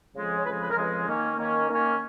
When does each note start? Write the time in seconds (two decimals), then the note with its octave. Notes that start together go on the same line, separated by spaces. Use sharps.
0.14 F2 C#3 F3 G#3
0.36 C#5
0.45 F2 C#3 F3 G#3 B4
0.61 B4
0.71 A#4
0.76 F2 C#3 F3 G#3 B4
1.07 D#3 A#3 C#4
1.37 D#3 A#3 C#4
1.68 D#3 A#3 C#4